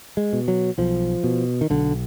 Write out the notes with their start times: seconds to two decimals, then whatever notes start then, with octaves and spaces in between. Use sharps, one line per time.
0.17 G#3
0.33 B2
0.48 F#3
0.78 B1 F3
1.24 B2
1.61 D#3
1.70 B1 D3